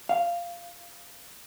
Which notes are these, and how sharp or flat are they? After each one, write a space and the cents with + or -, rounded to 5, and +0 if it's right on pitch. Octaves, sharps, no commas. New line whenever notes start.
F5 -10